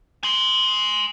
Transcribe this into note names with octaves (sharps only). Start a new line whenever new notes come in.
G#5 C6